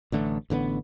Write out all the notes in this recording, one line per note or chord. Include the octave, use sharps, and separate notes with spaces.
A1 D3 A3
A1 D3 F#3 B3